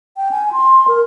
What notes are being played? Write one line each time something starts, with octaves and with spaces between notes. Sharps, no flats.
G5
G#5
C6
A#4